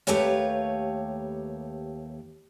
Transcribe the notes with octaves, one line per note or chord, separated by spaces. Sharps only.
D#2 A3 G4 B4 C#5 F5